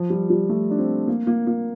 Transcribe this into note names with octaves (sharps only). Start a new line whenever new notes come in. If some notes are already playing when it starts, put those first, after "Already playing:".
Already playing: F3
G3
G3
A3
D4
C4
A#3
A#3
A#3